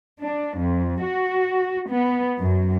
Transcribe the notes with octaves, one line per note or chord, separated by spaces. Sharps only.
D4
F2
F#4
B3
F#2